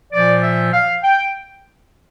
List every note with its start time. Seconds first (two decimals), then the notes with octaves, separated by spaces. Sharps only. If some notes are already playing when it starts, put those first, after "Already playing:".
0.12 A#2 F3 D5
0.42 E5
0.72 F5
1.03 G5